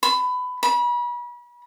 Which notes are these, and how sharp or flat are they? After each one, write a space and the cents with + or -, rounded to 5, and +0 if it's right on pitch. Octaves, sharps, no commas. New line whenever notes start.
B5 +20
B5 -35